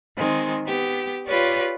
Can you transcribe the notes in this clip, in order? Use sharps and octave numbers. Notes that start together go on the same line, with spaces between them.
D#3 G#3 C4
B3 G4
F4 G4 B4 C#5 D5